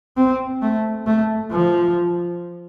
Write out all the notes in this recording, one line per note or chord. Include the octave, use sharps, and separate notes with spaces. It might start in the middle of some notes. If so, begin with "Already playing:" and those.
C4
A3
A3
F3